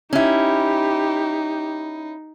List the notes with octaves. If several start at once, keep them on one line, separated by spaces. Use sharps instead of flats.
C#4 D#4 E4 G4